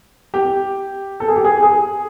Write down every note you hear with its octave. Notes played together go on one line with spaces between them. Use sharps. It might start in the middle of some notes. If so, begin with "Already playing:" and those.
G4
A4
G#4
G4
G#4
G#4